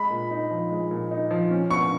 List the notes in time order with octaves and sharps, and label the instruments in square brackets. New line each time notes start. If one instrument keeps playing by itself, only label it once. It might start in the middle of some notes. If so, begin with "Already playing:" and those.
Already playing: [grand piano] G#3 [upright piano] B5
[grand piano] A#2
D#4
F3
G#3
A#2
D#4
F3
C#4
[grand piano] B2 [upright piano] C#6